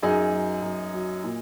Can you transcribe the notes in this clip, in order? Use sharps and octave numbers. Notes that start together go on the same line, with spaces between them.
F#2 D#4 G#4
F#3
F#2
F#3
A#2